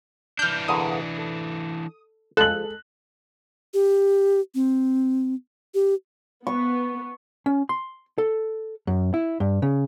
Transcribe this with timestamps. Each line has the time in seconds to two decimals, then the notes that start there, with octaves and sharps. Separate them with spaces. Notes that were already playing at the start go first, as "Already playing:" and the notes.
0.39 E3 D4 F6 G6
0.68 E2 D3 A#3 D#6
1.18 A4
2.37 F3 G#3 A4 F#6 F#7
3.74 G4
4.55 C4
5.74 G4
6.47 B3 C#6
7.46 C#4
7.69 C6
8.18 A4
8.87 F#2
9.14 E4
9.40 G2
9.62 C#3